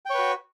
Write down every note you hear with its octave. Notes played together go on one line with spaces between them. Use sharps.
F#4 B4 C#5 G5